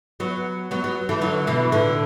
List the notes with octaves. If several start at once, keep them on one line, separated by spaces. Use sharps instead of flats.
F#3 B3
F#3 B3
F#3 B3
E3 A3
D3 F#3
B2 E3
A2 D3